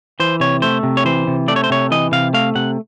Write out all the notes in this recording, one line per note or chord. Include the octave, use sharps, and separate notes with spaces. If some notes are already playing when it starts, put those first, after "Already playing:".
E3 C5
C3 C#5
A3 C5
C3
C#5
E3 C5
C3
A3 D5
C#5
C5
C3 C#5
E3 D#5
C3 F5
A3 F5
C3 F#5